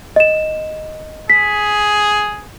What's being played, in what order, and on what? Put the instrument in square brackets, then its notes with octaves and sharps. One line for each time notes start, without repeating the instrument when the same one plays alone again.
[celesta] D#5 E7
[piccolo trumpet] G#4 [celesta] B6